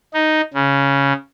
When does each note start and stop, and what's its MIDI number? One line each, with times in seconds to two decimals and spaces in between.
0.14 0.42 63
0.54 1.13 49